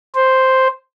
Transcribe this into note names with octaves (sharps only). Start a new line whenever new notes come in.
C5